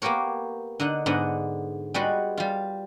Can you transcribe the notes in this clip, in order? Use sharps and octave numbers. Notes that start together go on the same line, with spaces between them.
A#3 B3 G4 A#4 C#5
D3 D#4 F#5
G#2 D3 B3 D#5 F#5
G3 G#3 F#4 B4 F#5
G3 F4